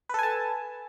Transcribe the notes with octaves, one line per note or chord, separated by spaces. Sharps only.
A4 B4 G#5 A5